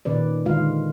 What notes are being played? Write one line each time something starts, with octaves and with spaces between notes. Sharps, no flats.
A#2 D#3 C#4 B4 D5
D3 D#3 G#3 F4 F5